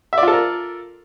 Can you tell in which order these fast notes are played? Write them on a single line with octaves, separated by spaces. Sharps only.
E5 D5 F4 A4 A#4